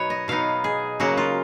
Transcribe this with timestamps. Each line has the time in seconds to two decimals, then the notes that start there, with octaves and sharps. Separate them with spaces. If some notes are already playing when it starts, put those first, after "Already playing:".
Already playing: B2 F#3 B3 D#4 B4 C#5
0.10 D#5
0.28 B2 F#3 B3 D#4 F5
0.64 G#4
1.00 C#3 F#3 A#3 F#4
1.17 F4